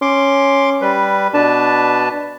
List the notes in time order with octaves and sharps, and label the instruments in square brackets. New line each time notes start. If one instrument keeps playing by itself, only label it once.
[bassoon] C#4 [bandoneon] C6 D6
[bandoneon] G3 B4
[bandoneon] B2 B4 A5 [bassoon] D4